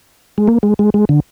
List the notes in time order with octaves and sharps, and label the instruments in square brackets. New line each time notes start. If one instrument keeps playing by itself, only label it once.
[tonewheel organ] G#3
A#3
G#3
G#3
G#3
D3